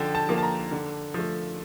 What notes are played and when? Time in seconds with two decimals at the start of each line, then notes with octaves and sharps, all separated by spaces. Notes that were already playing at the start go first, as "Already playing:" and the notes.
Already playing: D3 F3 G5 A5
0.15 A5
0.29 F3 A#3
0.38 A5
0.43 A#5
0.72 D3
1.14 F3 A3